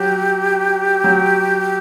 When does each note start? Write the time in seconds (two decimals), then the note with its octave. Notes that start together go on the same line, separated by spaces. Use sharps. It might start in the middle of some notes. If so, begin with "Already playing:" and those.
Already playing: F#3 G4
1.04 F#3